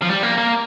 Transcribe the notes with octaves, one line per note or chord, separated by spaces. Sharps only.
F3
G3
A#3
A#3